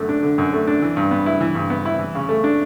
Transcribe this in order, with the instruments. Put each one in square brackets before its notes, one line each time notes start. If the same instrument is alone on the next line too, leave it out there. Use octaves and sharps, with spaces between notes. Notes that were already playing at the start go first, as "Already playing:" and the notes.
Already playing: [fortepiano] F#2 D3 A3
D4
D3
F#2
A3
D4
E3
G2
B3
E4
E3
G2
B3
E4
E3
C#3
A3
D4